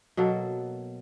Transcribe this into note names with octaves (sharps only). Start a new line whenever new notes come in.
B2 F#3 A#3 A4